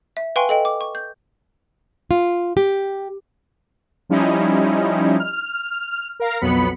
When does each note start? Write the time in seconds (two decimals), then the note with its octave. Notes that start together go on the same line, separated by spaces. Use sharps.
0.17 E5
0.36 B4 F5 G5 G#5 C6 C#6
0.49 A4 D#5 G5
0.65 D6
0.81 C#6
0.95 G6
2.11 F4
2.57 G4
4.09 F3 G3 C#4 D#4 E4
5.20 F6
6.20 A#4 F5 A#5
6.41 B1 F2 F#3 B3 B5 C#7